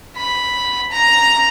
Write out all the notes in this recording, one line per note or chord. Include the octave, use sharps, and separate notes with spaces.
B5
A#5